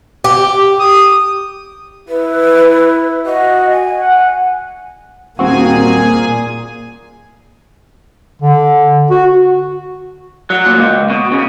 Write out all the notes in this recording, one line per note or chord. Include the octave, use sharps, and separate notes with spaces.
G4
D#6
E4 B4
F#4 D#5
G#5
F#5
D#1 A#2 A#3 C4 F#4 G#4 G#5
D3
F#4
F#3
A#2
C#2
B2
C#3